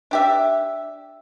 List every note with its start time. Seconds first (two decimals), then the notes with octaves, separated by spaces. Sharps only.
0.11 D4 G4 E5